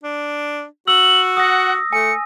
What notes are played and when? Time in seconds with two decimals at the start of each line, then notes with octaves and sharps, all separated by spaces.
0.04 D4
0.88 F#4 E6 F#7
1.37 F#5 D#6 A#6
1.93 A3 G#5 C#7